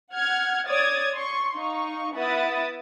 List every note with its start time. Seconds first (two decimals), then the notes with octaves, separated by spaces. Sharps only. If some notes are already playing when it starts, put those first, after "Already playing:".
0.13 F#5 F6 G#6
0.67 C#5 D5 D#6 G#6 A6
1.14 C6 C#6
1.56 D#4 F5 C#6
2.14 B3 E4 E5 F#5 D#6 A6